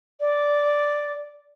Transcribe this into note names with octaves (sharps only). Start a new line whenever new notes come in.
D5